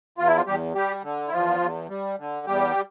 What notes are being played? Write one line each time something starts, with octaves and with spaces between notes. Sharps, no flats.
E2 F4
E4
F3 F4
E2 G3 G4
G3 G4
D3
E4
E2 F3 F4
E2
G3
D3
E2 G3 G4